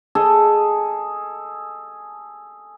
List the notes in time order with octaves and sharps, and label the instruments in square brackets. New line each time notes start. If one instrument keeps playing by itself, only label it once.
[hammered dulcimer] G#4 A4 D#5